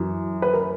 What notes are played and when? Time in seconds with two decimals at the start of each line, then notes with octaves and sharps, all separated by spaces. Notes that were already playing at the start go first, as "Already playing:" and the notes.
Already playing: F#2 E3
0.42 B4
0.53 A#4